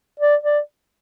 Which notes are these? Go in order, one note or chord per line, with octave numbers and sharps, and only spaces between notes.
D5
D5